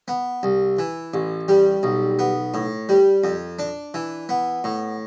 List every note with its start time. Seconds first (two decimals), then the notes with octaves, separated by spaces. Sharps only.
0.08 B3
0.43 C2
0.79 E3
1.14 A1
1.48 G3
1.83 B1
2.19 B3
2.54 A2
2.89 G3
3.24 F2
3.59 D4
3.94 E3
4.29 B3
4.64 A2